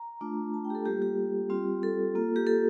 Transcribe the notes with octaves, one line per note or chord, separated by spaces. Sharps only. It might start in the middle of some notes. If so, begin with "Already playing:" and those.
Already playing: A#5
A3 D4 F4
A5
G5
G4
A4
G3 A#3 F4 G4
G4
G3 C4 F4
A4
A#3 F4
G4
A4